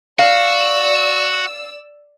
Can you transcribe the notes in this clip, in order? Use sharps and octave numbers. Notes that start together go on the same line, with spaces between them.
F#4 D5 F5 E6